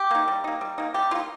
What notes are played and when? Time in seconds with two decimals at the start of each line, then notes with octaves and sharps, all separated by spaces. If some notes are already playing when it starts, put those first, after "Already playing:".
Already playing: G4
0.11 A#3 D#4
0.28 G3
0.44 A#3 D#4
0.61 G3
0.78 A#3 D#4
0.94 G3 G4
1.11 A#3 F4
1.15 D#4